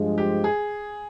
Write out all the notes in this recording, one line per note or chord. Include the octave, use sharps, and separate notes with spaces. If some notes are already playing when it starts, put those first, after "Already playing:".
Already playing: G2 F3 G#3
G4
G#4